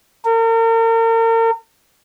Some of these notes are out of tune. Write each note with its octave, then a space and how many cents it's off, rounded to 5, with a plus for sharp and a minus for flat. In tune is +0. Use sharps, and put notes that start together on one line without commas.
A#4 -40